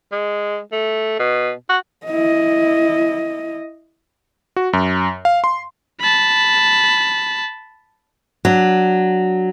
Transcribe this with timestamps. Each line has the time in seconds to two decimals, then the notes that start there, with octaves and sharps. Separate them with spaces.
0.12 G#3
0.72 A3
1.19 B2
1.69 F#4
2.06 E4 D#5
4.56 F#4
4.73 F#2
5.25 F5
5.44 C6
6.01 A5 B5
8.45 F#3 D4